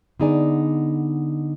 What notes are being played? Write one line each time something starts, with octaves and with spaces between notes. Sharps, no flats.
D3 B3 D#4 G#4 D5 G#5